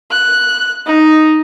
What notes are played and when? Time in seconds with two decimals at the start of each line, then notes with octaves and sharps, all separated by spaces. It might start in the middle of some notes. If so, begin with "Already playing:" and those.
0.11 F#6
0.86 D#4